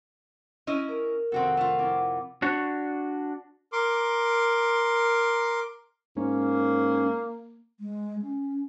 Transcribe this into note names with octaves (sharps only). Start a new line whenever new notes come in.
C#4 E4 D#5
A#4
F2 C3 D#3 C4 F#4 A4 F#5
A3 F4
F2 E4 D6
D4 F#4 C#5
A#4 C6 D6
G#2 A#3 C#4
G#3
C#4